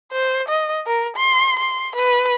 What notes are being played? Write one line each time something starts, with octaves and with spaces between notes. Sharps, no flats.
C5
D#5
A#4
C6
C6
B4